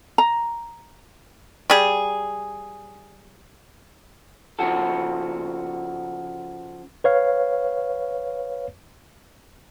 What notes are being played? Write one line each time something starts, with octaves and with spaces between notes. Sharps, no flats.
A#5
G3 G#4
C#3 F3 F#4 A4
B4 C#5 F5